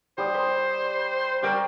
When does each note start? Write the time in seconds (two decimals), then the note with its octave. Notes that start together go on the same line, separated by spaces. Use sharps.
0.18 G3 C5 D#6
0.34 B5 C6
1.43 G3 A#4 G5 C#6